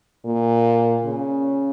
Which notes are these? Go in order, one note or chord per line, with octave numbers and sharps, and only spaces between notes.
A#2
C#3